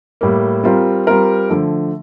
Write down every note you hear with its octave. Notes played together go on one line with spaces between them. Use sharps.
A2 G3 A#3
G3 C4 F4 A#4
G3 C4 F4 A#4
D3 F3 A3